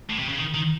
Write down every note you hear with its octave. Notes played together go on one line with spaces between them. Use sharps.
A2
C3
C#3
D#3
D#3